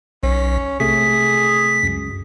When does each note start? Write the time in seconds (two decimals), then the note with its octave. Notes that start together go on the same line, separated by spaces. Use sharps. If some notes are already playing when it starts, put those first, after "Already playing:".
0.23 B1 C#4
0.80 C3 A3 G#4 B6
1.83 C#2 F#2